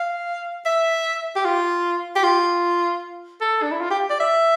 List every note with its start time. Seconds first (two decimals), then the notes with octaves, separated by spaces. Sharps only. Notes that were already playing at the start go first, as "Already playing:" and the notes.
Already playing: F5
0.66 E5
1.36 G4
1.45 F4
2.16 G4
2.23 F4
3.41 A4
3.63 D4
3.72 E4
3.81 F4
3.91 G4
4.10 D5
4.20 E5